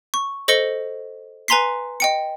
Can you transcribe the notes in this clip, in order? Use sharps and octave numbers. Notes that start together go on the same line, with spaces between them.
C#6
A4 C5 D#5 A#6 C#7 G7
B4 G#5 A#5 C6 B6 C7
D#5 G5 C#7